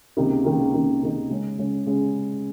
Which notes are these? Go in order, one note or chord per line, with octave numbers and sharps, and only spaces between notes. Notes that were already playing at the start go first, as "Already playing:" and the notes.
C#2 C3 D#3 A#3 D#4
C#2 C3 D#3 A#3 D#4
C#2 C3 D#3 A#3 D#4
C#2 C3 D#3 A#3 D#4
C#3 G#3 C#4
C#3 G#3 C#4
C#3 G#3 C#4